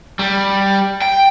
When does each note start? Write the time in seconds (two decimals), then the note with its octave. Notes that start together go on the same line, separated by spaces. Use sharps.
0.19 G3
1.02 G5